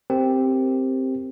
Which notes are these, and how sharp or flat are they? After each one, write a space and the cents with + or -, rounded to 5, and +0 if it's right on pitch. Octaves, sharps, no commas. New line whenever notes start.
C4 +0 G4 +0 A#4 +0